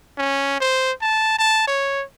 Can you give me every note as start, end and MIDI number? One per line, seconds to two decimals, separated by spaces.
0.18 0.57 61
0.60 0.92 72
1.02 1.34 81
1.39 1.64 81
1.67 2.03 73